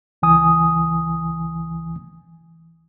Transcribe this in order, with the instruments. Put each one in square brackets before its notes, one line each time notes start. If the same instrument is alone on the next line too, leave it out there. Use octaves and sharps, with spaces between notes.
[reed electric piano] C#2 E3 G#5 D#6